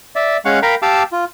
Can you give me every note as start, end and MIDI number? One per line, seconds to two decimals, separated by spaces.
0.16 0.37 74
0.16 0.37 76
0.45 0.59 56
0.45 0.59 61
0.45 0.59 77
0.45 0.59 78
0.45 0.59 85
0.63 0.75 70
0.63 0.75 77
0.63 0.75 79
0.63 0.75 82
0.63 0.75 83
0.82 1.03 67
0.82 1.03 77
0.82 1.03 81
0.82 1.03 86
0.82 1.03 88
1.12 1.25 65